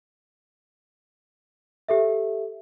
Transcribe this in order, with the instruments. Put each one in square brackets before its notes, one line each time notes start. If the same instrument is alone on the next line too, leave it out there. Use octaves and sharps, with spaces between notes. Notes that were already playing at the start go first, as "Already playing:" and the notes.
[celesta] G4 A4 E5